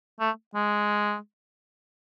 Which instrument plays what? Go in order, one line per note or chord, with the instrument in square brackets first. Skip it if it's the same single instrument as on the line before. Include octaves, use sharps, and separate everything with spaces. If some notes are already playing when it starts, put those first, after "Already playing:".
[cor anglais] A3
G#3